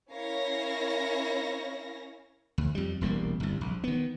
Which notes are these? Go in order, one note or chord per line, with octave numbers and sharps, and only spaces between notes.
C#4 E4 A#4 C#5 F5 A#6
D2
F2 G3
E1 C2 G3 A#3
G1 C2
A#1
D#3 B3